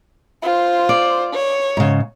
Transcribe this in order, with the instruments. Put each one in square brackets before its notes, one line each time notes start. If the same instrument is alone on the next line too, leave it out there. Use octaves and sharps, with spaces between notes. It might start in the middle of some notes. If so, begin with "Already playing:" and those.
[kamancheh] F4 C5
[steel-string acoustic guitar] D5
[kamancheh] C#5
[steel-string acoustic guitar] G#2 C#3